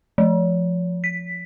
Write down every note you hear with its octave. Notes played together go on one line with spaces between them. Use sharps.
F3
B6